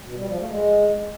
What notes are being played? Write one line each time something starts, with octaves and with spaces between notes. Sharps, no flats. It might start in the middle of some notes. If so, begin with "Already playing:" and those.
B2
G3
F3
A3
G#3